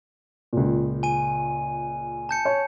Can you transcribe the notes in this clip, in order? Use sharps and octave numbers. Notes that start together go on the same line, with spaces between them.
C#2 A#2
G#5 D#7
A5 G6 C#7
C#5